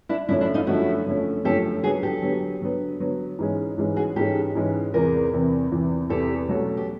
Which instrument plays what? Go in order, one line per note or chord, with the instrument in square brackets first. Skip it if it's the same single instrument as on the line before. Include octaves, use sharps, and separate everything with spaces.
[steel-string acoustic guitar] D4 E4
[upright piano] F#2 D3 F3 A3 C#4 [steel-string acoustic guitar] D4 E4
[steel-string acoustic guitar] D4 E4
D#4 F4
[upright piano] F#2 D3 F3 A3 C#4 [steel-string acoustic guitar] E4 F#4
[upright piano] F#2 D3 F3 A3 C#4
[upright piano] F#2 D3 F3 A3 C#4 [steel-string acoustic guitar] G4 A4
[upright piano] D3 F#3 B3 [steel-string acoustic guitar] F#4 G#4
[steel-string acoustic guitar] G4 A4
[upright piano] D3 F#3 B3
D3 F#3 B3
D3 F#3 B3
G#2 E3 G#3 C#4
G#2 E3 G#3 C#4
[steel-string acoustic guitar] F#4 G#4
[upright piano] G#2 E3 G#3 C#4 [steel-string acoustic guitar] G4 A4
[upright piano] G#2 E3 G#3 C#4
[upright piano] E2 C3 E3 [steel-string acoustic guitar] G#4 A#4
[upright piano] E2 C3 E3
E2 C3 E3
[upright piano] E2 C3 E3 [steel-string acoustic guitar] G4 A4
[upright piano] B2 F#3 A3 C#4 F#4
[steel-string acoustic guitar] G4